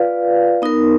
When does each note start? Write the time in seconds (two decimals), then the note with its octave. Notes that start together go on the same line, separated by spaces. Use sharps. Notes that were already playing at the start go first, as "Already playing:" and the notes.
Already playing: F4 B4 D5 F5
0.62 B3 D#4 A#4